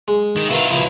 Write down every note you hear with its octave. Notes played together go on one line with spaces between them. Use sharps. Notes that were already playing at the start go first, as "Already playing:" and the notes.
G#3
D#3
B2 D#3 E4 F4
C#2 B2 F3 E4